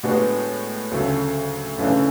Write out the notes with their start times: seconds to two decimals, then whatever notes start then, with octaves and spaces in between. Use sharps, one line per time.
0.03 A2 G#3 B3 D4 F#4
0.91 D2 C#3 F#3 A3
1.78 F#2 C#3 E3 A3 D4